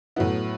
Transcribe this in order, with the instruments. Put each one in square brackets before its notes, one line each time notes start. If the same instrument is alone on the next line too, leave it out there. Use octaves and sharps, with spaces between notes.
[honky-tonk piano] A2 F#3 B3 E4